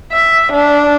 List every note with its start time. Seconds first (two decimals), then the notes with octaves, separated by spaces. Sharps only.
0.12 E5
0.52 D4